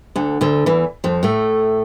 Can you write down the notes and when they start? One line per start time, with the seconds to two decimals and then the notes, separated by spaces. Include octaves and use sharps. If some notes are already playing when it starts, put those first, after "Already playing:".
0.16 D2 D3
0.41 D2 D3
0.66 E2 E3
1.04 F2 F3
1.23 A2 A3